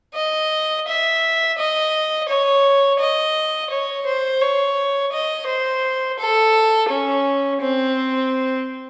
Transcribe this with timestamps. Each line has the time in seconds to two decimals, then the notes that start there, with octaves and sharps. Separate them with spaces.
0.16 D#5
0.87 E5
1.58 D#5
2.29 C#5
3.00 D#5
3.70 C#5
4.06 C5
4.41 C#5
5.12 D#5
5.48 C5
6.19 A4
6.89 C#4
7.62 C4